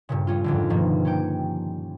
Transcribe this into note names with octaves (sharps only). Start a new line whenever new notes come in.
G2 A#2 C#3
G3 C#4 F4
F2 G#2 D3
G2 B2 D#3 F3 A#3
C#4 G4 G5